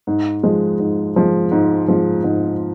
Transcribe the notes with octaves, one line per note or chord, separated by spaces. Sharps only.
G#2
F3 G#3
G#2
F3 G#3
G#2
F3 G#3
G#2